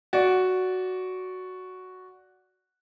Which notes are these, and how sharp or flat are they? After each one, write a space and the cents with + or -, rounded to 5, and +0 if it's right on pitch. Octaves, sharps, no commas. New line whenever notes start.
F#4 +0 D5 -15